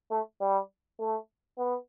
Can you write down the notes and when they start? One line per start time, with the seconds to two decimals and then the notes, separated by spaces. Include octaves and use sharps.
0.11 A3
0.40 G3
0.98 A3
1.58 B3